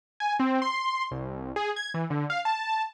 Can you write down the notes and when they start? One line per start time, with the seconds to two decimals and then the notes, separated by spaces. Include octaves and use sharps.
0.20 G#5
0.40 C4
0.62 C6
1.11 C2
1.56 G#4
1.76 G#6
1.94 E3
2.10 D3
2.30 F5
2.45 A5